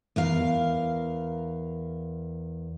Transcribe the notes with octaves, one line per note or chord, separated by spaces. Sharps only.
E2 A#4 F5